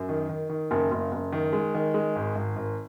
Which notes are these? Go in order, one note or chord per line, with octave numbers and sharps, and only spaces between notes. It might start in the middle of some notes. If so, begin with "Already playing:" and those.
Already playing: F#2
D#3
D#3
D#3
F#1
F#1
F#1
D#3
G#3
D#3
G#3
G#1
G#1
G#1